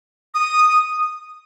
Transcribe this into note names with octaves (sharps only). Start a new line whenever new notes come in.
D#6